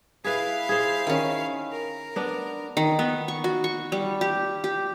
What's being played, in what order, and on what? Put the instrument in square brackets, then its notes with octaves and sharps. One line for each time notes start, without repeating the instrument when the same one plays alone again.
[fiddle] E4 F5 [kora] G#4 B4
[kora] G#4 C5
[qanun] D#3 C#4
[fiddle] A#4
[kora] B3 D4
[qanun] D#3
B3
C#6
F#4
C#6
G3
G4
G4